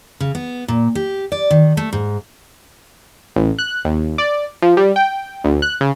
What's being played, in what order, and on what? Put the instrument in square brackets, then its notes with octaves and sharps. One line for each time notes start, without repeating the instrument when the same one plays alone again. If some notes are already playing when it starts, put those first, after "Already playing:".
[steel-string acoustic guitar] C#3
B3
A#2
G4
D5
D#3
A3
G#2
[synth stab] A1
F#6
D#2
D5
F3
G3
G5
D2
F#6
C#3